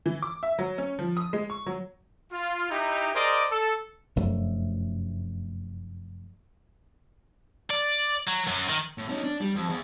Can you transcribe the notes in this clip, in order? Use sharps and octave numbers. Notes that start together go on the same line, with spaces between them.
E3
D6
E5
F#3
C#4
F3
D#6
G#3
C#6
F#3
F4
D#4 E4 G4
G#4 A#4 C5 D5 D#5 D6
A4
F1 F#2 A3
D5
F#3
F#2 F#3
D#3
A2
C#4 D#4
D4
G3
F2
E2